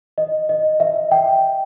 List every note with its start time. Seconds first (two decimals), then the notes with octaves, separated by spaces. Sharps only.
0.18 D#5
0.49 D#5
0.80 E5
1.11 G5